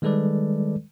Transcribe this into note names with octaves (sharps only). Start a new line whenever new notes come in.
D#3 G3 G#3 A4 B4 D5